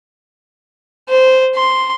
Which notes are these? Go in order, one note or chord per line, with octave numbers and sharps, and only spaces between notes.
C5
C6